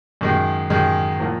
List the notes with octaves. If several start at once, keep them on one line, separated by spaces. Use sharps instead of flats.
F#2 D#3 G#3
F#2 D#3 G#3
A#2 F3 A#3